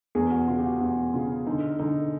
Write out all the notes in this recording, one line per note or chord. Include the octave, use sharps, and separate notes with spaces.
E2 G#4
F#4
C#3 F4
G4
F#4
E2 F#4
C#3 F4
D3 D#4
D3 D#4